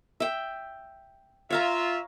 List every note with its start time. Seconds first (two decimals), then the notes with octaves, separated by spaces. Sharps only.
0.20 E5 G5
1.50 F4 C#5 E5 F5 A#5